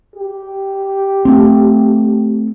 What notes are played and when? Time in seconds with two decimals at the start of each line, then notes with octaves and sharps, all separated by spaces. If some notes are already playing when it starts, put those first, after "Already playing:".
0.16 G4
1.25 A3 C4